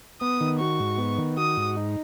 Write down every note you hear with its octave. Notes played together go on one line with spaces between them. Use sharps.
B3 D#6
D#3
F#4 C#6
G#2
B3
D#3
F#4 D#6
G#2
D#4